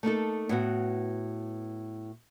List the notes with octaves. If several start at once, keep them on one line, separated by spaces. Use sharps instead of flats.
A3 A#3 D#4 A4
A2 B3 F#4